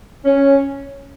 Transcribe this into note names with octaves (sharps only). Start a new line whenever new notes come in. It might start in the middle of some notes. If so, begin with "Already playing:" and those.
C#4